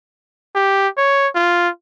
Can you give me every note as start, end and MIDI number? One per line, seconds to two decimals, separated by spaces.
0.55 0.88 67
0.97 1.28 73
1.35 1.69 65